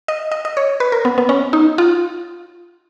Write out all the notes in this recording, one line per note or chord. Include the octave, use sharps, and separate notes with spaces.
D#5
D#5
D#5
C#5
B4
A#4
B3
B3
C#4
D#4
F4